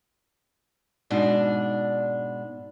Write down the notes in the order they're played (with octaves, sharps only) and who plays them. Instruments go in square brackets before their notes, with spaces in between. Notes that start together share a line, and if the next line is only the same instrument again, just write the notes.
[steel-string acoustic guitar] G#2 B2 D4